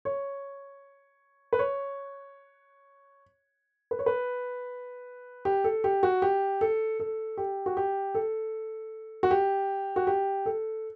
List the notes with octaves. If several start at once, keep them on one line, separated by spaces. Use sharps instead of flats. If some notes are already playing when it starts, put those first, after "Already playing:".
C#5
B4
C#5
B4
C#5
B4
G4
A4
G4
F#4
G4
A4
A4
G4
F#4
G4
A4
F#4
G4
F#4
G4
A4